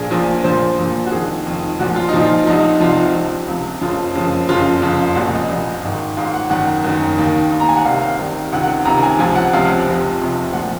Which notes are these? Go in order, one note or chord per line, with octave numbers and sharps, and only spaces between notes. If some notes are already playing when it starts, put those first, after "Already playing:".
Already playing: A#1 A#2 F3 G#4
A#1 A#2 F3
A#1 A#2 F3 C5
A#1 A#2 F3
F#4
F1 F2 D#3 G#4
F1 F2 D#3
A#1 A#2 F3 F#4
F4
A#1 A#2 F3 D#4
F4
C2 C3 F3 D#4
C2 C3 F3 F4
C#2 C3 F3
C#2 C3 F3
F#1 F2 C#3 F3 F4
F#1 F2 C#3 F3
F#1 F2 C#3 F4
F#1 F2 C#3
C2 A#2 F3 F#4
D#5
C2 A#2 F3
G#1 G#2 D#3
G#1 G#2 D#3 F5
F#5
F#1 F#2 D#3 F#5
F#1 F#2 D#3
D#2 D#3
D#2 D#3
A#5
G#5
F#5
C2 C3 D#3 F5
F5
C2 C3 D#3
C#2 C3 D#3 F#5
F#5
C#2 C3 D#3 A#5
G#5
C#2 C3 F3 G#5
F#5
C#2 C3 F3 F5
F1 F2 C3
F1 F2 C3
A#2 F3 F#5